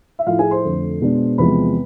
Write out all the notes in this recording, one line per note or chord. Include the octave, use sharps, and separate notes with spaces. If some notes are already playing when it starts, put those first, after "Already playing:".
E5
A2 F3 A3 E4 F4 F5
G#4 G#5
C5 C6
F2 D3 A3
B2 G#3 B3 D4
E2 C3 F3 G#3 B3 B4 B5